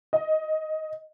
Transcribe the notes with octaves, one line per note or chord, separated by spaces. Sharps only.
D#5